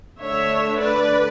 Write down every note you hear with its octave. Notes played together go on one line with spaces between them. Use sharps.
D3 A3 D4 C#5 E5
B4 D5